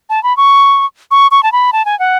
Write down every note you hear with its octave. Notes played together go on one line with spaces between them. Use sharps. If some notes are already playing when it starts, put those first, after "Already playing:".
A5
B5
C#6
C#6
C#6
A5
B5
A5
G#5
F#5